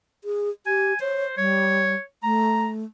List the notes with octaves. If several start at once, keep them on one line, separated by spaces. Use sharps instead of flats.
G#4
G4 G#5
C5 C#5
G3 C#5
A3 A#5